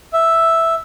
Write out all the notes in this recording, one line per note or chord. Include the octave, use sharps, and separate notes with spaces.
E5